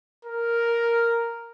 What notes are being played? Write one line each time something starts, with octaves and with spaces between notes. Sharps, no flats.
A#4